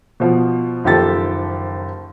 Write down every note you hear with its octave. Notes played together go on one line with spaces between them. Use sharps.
B2 F3
F#1 D#3 F3 G4 A4 A6